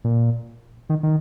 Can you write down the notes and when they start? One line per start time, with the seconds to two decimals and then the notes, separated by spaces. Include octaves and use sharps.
0.04 A#2
0.89 D#3
1.03 D#3